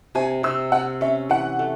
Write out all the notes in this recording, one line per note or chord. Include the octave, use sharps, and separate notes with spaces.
C3 G#5
C3 E6
C3 F#5
C#4 E5
E3 F#5
A3